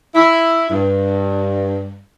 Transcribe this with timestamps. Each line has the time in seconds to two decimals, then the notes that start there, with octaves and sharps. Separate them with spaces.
0.15 E4
0.70 G2